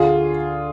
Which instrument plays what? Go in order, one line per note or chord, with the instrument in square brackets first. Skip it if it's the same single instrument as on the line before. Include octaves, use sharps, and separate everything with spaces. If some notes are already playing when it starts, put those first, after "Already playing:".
Already playing: [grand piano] D2 D3 F4 G#4